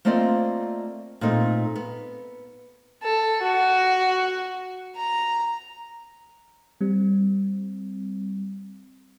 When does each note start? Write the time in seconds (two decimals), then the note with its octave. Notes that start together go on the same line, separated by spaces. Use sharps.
0.05 A3 A#3 C4 F4 D5 D#5
1.21 A#2 A3 C4 D#4
1.76 B3
3.03 A4
3.41 F#4
4.96 A#5
6.81 G3 C4